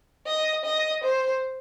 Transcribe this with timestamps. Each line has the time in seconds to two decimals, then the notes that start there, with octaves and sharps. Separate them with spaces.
0.27 D#5
0.65 D#5
1.04 C5